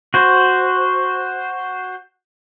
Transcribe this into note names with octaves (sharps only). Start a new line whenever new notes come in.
F#4 C5